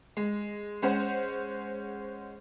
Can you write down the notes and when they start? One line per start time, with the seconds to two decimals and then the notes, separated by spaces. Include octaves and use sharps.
0.17 G#3
0.82 G#3 C#4 C5 F#5